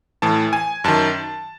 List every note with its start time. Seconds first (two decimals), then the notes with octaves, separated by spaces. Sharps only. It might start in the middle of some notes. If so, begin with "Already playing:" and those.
0.22 A2 E3 A5
0.53 G#5
0.84 F#2 D#3 A5